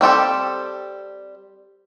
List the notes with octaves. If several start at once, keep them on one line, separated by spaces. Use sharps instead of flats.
G3 C4 G4 A4